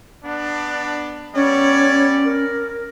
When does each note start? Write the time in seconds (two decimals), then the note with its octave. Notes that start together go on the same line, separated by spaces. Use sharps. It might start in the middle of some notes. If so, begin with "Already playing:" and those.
0.25 B3 D4
1.35 G3 B3 C#4 C#5 D5
2.25 A#4